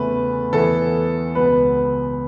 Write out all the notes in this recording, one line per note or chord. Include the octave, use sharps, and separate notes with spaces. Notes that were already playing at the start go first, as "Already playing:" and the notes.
Already playing: E2 C#3 A3 B4
E2 E3 B3 A4
C#2 B2 B3 B4